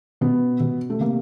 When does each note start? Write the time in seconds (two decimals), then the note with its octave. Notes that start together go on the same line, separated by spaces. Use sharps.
0.21 B2 B3
0.60 B2
0.90 A3
1.00 C3 A#3